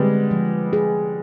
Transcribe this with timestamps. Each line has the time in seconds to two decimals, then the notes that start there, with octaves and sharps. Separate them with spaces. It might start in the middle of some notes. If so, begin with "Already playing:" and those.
Already playing: D3 G3 G#3 B3 C4
0.31 F3
0.73 G#4